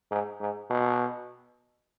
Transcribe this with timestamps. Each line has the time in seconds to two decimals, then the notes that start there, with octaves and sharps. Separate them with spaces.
0.11 G#2
0.40 G#2
0.70 B2